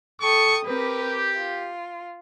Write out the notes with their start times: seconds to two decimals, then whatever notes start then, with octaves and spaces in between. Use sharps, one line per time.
0.21 A4 G5 C#6 D#6
0.65 C4 G4 A#4 B4
1.36 F4